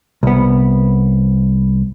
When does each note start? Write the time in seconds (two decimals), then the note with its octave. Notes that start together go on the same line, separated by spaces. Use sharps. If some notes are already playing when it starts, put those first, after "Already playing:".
0.23 C2 B3